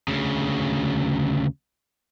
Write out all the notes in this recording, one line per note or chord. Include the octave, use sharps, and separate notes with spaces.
D2 C#3